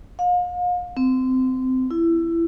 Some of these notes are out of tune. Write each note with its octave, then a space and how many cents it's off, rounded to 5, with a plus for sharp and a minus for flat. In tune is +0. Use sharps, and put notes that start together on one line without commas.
F5 +40
C4 -20
E4 +20